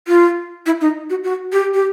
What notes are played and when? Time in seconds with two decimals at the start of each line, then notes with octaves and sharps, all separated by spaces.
0.08 F4
0.66 E4
0.81 D#4
1.10 F#4
1.24 F#4
1.52 G4
1.74 G4